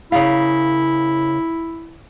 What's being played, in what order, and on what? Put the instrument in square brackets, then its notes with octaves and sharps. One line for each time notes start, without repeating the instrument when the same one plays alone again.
[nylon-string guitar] C#3 A#4 F5 [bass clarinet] E4